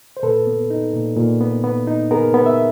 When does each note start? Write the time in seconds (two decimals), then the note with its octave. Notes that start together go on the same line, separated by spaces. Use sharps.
0.17 C5
0.23 A#2 A4 B4
0.47 B3
0.70 D#4
0.93 A#2
1.16 A#2
1.41 B3
1.64 B3
1.87 D#4
2.11 B3 G#4 A#4
2.34 B3
2.46 E5